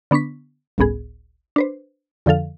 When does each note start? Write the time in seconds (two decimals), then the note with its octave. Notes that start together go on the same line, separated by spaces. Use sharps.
0.11 D3 B3 D4 C#6 B6
0.78 G1 C#2 A2 B3 G#4
1.56 D4 B4 C5
2.26 F2 D3 F3 A4 F5